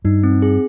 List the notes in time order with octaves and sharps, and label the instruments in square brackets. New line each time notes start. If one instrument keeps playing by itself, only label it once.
[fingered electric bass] G2 [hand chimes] D#4
[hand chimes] C4
G#4